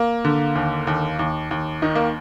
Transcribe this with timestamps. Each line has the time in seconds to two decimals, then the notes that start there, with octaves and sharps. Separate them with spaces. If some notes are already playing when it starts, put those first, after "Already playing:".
Already playing: A#3
0.25 D3
0.55 D#2
0.87 D#2
1.19 D#2
1.51 D#2
1.82 D#3 D#4
1.95 A#3